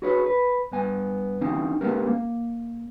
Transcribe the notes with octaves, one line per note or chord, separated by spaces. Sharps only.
F#4 G#4 B4 C#5
B4
G2 B3 G#5
E3 C4 C#4 D#4
G#3 A#3 B3 C#4 G4 A#4
A#3